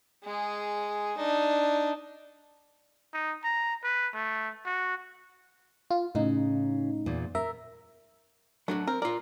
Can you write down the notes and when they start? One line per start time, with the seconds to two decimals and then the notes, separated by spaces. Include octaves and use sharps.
0.24 G#3 G#4
1.18 D4 D#4
3.14 D#4
3.44 A#5
3.84 B4
4.14 A3
4.66 F#4
5.91 F4
6.15 A2 C#3 D#4
7.06 E2 A#2
7.35 A#4 E5
8.68 F#3 A3 D4 F#4
8.88 C4 A#4
9.02 F4 A#4 D5